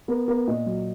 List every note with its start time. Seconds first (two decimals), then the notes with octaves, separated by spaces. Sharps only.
0.08 B3 A#4
0.28 B3 A#4
0.48 A#2 D#5
0.66 F#3